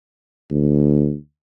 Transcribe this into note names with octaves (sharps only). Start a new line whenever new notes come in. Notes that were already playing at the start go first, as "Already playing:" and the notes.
D2